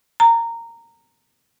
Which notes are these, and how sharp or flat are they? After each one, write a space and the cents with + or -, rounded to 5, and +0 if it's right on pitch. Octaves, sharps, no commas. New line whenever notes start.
A#5 -15